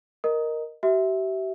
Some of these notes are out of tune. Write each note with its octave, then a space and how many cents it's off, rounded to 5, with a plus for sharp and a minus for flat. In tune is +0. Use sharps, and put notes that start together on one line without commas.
A#4 +0 D#5 -5
G4 -45 E5 -10